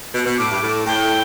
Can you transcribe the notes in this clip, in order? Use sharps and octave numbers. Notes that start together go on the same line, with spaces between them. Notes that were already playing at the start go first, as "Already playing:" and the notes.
B2
B2
A2 D6
G2
A2
A2 G5